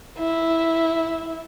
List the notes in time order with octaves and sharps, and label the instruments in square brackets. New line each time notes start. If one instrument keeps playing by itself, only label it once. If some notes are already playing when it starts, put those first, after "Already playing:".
[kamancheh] E4